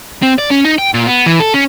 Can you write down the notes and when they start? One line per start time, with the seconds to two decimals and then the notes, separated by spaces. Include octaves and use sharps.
0.23 C4
0.39 D5
0.51 C#4
0.65 D#4
0.78 G5
0.94 A#2
1.07 B3
1.26 E3
1.40 A4
1.54 C#4